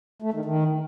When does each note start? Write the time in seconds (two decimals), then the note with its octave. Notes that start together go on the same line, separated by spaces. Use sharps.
0.22 A3
0.34 D#3
0.45 D#3